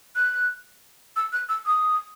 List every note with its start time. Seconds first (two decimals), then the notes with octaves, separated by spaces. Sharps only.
0.15 F#6
1.16 E6
1.32 F#6
1.49 E6
1.66 D#6